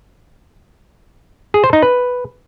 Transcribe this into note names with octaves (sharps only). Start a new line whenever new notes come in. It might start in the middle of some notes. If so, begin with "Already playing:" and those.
G#4
C5
D#4
B4